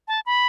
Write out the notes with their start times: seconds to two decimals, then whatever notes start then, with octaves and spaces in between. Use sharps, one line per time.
0.08 A5
0.26 B5